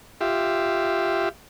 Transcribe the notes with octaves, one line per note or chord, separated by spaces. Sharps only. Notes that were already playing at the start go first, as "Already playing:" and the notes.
F4 G4 E5